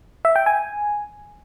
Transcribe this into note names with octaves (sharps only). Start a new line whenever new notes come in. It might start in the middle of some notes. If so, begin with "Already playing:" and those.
E5
G5
G#5